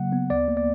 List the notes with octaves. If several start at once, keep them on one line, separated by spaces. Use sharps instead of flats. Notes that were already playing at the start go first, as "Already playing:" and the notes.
Already playing: C#3 F#3 A#3 F#5
B3
D2 D5
A#3
D5